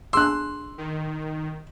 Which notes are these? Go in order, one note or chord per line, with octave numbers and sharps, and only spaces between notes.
D4 G#4 C6 D6 E6 F#6
D#3